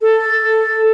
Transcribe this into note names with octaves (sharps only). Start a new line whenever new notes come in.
A4